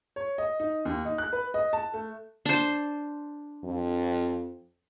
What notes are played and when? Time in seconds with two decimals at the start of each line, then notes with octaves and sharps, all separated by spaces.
0.16 C#5
0.38 D#5
0.60 D#4
0.85 D#2
1.05 D#4
1.18 F#6
1.33 B4
1.54 D#5
1.73 A5
1.94 A3
2.45 D4 C5
3.64 F2